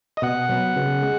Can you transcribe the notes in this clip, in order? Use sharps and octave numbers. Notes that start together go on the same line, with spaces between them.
D#5
B2 F#5
F#3 B3
C#3
G#3